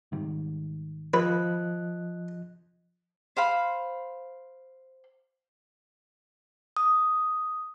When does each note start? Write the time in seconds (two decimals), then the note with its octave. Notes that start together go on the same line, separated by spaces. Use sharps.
0.12 G#2 D#3 G3
1.14 F3 B4 D#5 F#6
3.37 C5 F5 B5
6.77 D#6